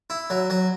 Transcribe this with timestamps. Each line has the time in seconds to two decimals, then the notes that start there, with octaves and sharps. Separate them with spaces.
0.10 E4
0.30 F#3
0.50 F#3